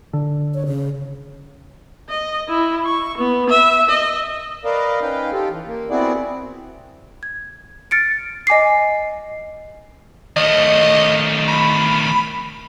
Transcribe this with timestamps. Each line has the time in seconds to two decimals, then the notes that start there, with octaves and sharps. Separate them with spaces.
0.13 D3
0.54 C#5
0.66 C#3
2.09 D#5
2.49 E4
2.85 C#6
3.18 B3
3.50 E5
3.89 D#5
4.65 A#4 B4 D5 D#5 F5
5.01 C#4 D#4 B4 F5 G5
5.32 F4 G4 A4
5.49 E3
5.65 A#3
5.90 B3 C4 E4 F#4 G#4 D5
7.23 G#6
7.91 F6 A6 C#7 D7
8.47 D#5 G#5 D6 C7
10.36 D#3 A3 D#5
11.48 B5